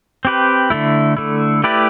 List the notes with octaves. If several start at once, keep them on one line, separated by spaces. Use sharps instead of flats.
C4 G4 B4
D3 A3 E4
D3 A3 E4
A3 E4 G4 B4 D5